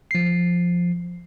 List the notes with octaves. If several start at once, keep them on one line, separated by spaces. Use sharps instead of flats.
F3 C7